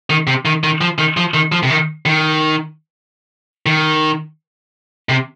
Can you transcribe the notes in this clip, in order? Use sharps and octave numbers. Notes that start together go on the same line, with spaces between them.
D#3
C3
D#3
D#3
F3
D#3
F3
D#3
F3
C3
D#3
D#3
D#3
C3